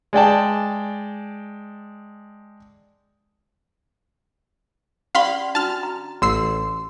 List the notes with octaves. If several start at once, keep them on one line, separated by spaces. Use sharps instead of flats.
G#3 D5 G5 A5
C#4 G4 D5 F5 B5 C6
D4 F#4 A5 F6
A#5
A1 C6 E6 C7